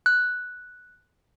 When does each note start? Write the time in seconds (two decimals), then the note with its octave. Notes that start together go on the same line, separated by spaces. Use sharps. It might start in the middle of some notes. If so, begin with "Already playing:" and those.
0.06 F#6